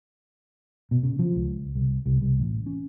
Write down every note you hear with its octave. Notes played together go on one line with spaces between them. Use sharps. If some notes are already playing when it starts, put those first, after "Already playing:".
B2
C#3
F3
C#2
C2
C2
C2
A1
C#4